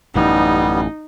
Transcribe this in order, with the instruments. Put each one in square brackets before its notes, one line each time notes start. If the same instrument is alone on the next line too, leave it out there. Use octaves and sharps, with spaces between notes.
[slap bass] A1 F#2 [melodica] G3 B3 [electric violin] D#4